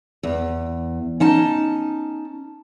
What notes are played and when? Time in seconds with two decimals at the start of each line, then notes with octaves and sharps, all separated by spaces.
0.23 E2
1.20 C#4 D#4 A5